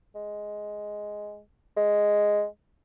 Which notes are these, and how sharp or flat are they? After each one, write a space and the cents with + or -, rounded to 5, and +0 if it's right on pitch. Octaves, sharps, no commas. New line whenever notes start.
G#3 +5
G#3 +0